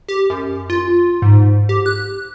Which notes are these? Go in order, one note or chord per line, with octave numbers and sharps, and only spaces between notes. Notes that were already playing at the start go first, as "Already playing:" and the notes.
G4
F#2
F4
G#2
G4
F#6